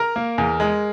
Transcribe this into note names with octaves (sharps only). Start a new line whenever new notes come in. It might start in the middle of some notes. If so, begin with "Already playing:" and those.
Already playing: A#4 A#5
A#3
E2
G#3